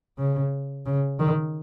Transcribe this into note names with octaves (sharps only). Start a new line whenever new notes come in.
C#3
C#3
D#3